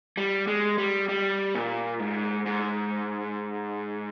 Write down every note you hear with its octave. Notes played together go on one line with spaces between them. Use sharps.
G3
G#3
G3
G3
A#2
G#2
G#2